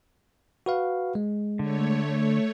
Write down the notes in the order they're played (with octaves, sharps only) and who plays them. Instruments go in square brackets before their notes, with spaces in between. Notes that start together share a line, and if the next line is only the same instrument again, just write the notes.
[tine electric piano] F#4 B4 F5
G#3
[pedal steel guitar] D3 [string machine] A3 C#5